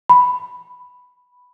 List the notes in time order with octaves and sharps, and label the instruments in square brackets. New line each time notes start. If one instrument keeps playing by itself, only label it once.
[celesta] B5